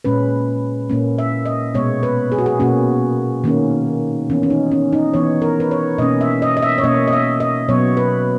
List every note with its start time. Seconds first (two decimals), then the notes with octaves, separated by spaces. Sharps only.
0.05 A#2 G#3 C#4 B4
0.90 A#2 A#3 C#4
1.18 E5
1.46 D#5
1.74 B2 G#3 B3 C#5
2.03 B4
2.32 G#4
2.38 F#4
2.46 G#4
2.60 B2 A#3 C#4 F#4
3.44 D#3 A#3 C#4
4.30 E3 B3 C#4
4.43 C#4
4.50 D#4
4.72 C#4
4.93 D#4
5.13 E3 B3 C#5
5.42 A#4
5.60 B4
5.71 C#5
5.98 B2 A#3 C#4 D#5
6.21 E5
6.42 D#5
6.57 D#5
6.62 E5
6.78 C#5
6.84 B2 A#3 C#4 D#5
7.08 D#5
7.13 E5
7.40 D#5
7.69 B2 F#3 B3 C#5
7.97 B4